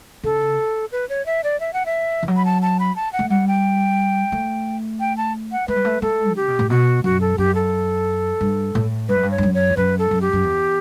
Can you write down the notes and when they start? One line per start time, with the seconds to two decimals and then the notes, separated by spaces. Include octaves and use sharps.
0.23 C#3 A4
0.92 B4
1.09 C#5
1.26 E5
1.44 D5
1.60 E5
1.73 F#5
1.86 E5
2.23 E3
2.28 F#3
2.36 B5
2.45 A5
2.62 A5
2.80 B5
2.96 A5
3.13 F#5
3.19 A3
3.30 G3 F#5
3.48 G5
4.32 A3
5.00 G5
5.17 A5
5.52 F#5
5.68 A3 B4
5.76 G3
5.85 A3
6.02 A3 A4
6.36 C#3 G4
6.48 B2
6.59 A2
6.70 B2 F#4
7.04 F#2 F#4
7.21 A4
7.38 F#2 G4
7.55 A4
8.41 G2
8.75 A2
9.09 G2 B4
9.16 F#2
9.23 G2
9.31 C#5
9.38 G2
9.43 F#2
9.54 C#5
9.69 E2
9.77 F#2 B4
9.99 A4
10.11 F#2
10.21 G4
10.33 F#2
10.44 E2